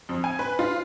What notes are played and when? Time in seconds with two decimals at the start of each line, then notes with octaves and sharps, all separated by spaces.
0.09 F2
0.24 G#5
0.39 B4
0.59 F4